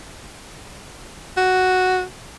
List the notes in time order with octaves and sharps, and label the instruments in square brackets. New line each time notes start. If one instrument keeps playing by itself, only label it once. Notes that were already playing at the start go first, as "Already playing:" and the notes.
[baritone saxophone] F#4